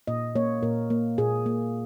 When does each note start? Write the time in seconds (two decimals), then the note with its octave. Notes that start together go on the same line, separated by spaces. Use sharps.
0.07 A#2 D#5
0.36 A#3 C#5
0.63 A#2 A#4
0.90 A#3
1.18 A#2 G#4
1.46 A#3